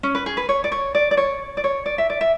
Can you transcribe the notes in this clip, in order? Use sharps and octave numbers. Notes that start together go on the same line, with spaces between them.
C#4
B4
G#4
B4
C#5
D5
C#5
D5
D5
C#5
D5
C#5
D5
E5
D5
E5